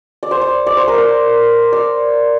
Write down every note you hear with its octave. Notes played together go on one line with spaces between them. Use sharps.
D5
C5
D5
D5
C5
A#4
C5
D5